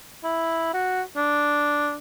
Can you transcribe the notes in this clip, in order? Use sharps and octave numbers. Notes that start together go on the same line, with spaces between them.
E4
F#4
D4